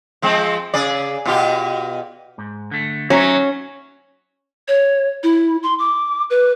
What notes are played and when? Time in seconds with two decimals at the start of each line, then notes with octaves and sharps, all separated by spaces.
0.22 F3 G#3 C4
0.74 C#3 G#4 D5
1.25 B2 F4 G4
2.38 G#2
2.71 D3 A3
3.10 F#3 C#4 D#4 E5
4.68 C#5
5.23 E4
5.63 C6
5.79 D6
6.30 B4